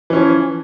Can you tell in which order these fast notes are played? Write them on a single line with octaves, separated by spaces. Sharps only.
E3 C#4 F3